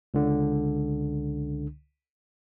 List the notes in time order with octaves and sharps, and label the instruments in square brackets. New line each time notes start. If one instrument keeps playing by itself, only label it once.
[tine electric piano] C#2 D3